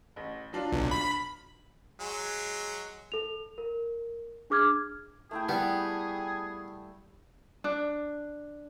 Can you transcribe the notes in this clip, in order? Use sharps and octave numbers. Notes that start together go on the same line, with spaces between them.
A1
F#3 D4 F4
B1
B5
F#3 G#3
A4 F7
A#4
D4 G#4 D6 F6 G#6
A3 E4 G#4 G5
G3 B3
D4